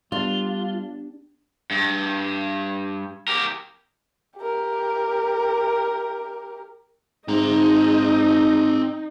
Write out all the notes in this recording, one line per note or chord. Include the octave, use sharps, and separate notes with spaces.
G3 B3 D4 F4 G4
G2
G4 A#4
G4 A#4
G#2 C4 D#4 A#5